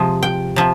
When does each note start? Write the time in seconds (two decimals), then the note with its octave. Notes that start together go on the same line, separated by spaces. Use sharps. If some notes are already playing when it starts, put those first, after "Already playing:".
Already playing: C3 F3 G#3
0.23 G5
0.56 C3 F3